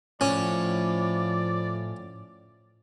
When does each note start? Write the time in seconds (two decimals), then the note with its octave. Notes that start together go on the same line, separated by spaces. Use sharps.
0.21 A2 F3 C#4 D5